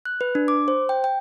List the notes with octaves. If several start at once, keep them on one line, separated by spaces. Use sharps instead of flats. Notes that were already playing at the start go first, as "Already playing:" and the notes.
F#6
B4
D4
D6
C5
G5
G5